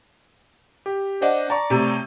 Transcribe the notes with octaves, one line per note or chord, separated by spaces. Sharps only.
G4
D4 C5 D#5 F#5
D5 A5 A#5 C#6
A2 C3